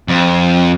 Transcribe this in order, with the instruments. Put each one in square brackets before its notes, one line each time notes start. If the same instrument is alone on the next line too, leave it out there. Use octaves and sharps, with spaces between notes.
[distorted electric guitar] F2